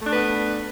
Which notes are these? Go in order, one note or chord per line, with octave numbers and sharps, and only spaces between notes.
A3 B3 D4 B4